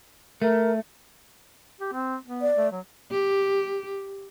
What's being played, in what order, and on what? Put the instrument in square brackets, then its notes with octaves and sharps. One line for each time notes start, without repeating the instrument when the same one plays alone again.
[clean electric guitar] A3 [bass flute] A#4
[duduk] G4
C4
B3
[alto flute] D5
[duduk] A3
F#3
[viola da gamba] G4